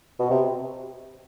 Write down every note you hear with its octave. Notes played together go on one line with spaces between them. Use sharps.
B2
C3